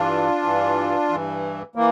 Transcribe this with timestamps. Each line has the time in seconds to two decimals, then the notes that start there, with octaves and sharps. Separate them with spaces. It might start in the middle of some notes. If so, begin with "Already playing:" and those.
Already playing: G2 E3 D4 F4
0.43 G2 E3
1.09 G2 E3
1.75 E3 A#3